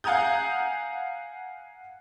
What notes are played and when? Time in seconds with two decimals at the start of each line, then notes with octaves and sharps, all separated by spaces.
0.04 F5 F#5 G#5 A#5 D#6 G6